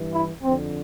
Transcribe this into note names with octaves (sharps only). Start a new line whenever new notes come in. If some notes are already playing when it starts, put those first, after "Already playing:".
Already playing: G2 E3
E4
F2 D3 C4